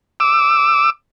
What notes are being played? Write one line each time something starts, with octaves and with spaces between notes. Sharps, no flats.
D6 E6